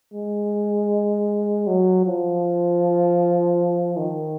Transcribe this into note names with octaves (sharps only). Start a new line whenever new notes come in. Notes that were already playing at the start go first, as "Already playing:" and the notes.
G#3
F#3
F3
D#3